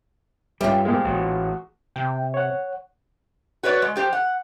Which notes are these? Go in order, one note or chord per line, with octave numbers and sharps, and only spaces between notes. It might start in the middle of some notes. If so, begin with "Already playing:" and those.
G2 G3 C#4 F4 G4 E5
A#2 F3 G#3
A1 F#4
C3 G5
C#5 F#5
F#4 B4 C#5 D5
G#3
F3 G4 C5
F#5